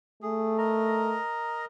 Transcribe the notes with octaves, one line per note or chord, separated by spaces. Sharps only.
A3 G#4
A#4 D#5 A#5